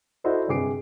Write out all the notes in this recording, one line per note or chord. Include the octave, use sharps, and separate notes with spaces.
E4 F#4 A4 C5 D5 D#5
G2 C3 G#4 D6 C7 D7